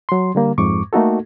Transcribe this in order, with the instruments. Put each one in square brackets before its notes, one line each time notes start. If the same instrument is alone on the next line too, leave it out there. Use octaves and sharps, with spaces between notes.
[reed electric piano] F#3 C6
D3 G3 A#3
F2 G#2 C#6 D6
A3 A#3 D#4 F#4 A4